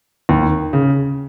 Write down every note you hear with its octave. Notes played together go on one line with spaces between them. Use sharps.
D#2
C#3